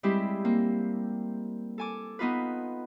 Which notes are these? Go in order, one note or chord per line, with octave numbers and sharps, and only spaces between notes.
G3 G#3 C4 E4 G4
A#3 C4
A4 G#5 D6
B3 D#4 F4 B4